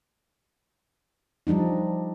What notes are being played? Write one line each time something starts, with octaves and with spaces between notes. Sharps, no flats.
F3 G3 D4 D#4